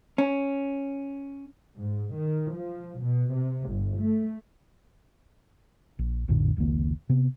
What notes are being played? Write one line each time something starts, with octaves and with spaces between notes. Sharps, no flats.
C#4
G#2
D#3
F3
B2
C3
G1
A3
A#1
A#1 F2 A2 D3
F1 C#2 D#3 A#3
C3 B3